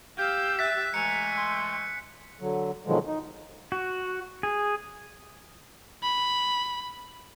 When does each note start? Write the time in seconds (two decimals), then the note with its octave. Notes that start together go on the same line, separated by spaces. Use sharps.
0.18 G4 F5 E6 G6
0.59 E5 F#6 A6 B6
0.94 E3 G#3 A3 G#5 A#5 C#7
1.37 C6
2.40 D3 F#3
2.86 B2 D3 D#3 F3 F#3 G#3
3.07 D#4
3.72 F#4
4.43 G#4
6.03 B5